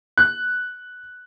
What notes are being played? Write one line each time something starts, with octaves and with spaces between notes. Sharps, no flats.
F#6